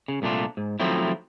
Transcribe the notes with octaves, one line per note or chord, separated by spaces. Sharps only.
C#3
C2 A#2 A3 D4 F4
G#2
D#3 F3 F#3 A3 C4 E4